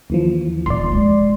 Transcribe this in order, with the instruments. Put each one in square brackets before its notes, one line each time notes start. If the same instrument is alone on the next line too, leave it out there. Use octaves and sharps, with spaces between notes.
[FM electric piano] D#2 E3 F3
[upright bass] D#1 D3 [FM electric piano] D5 C6
[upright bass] G#3